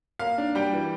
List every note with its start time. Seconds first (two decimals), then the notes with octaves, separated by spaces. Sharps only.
0.19 A#3 F5
0.38 D4
0.55 G3 G5
0.73 E3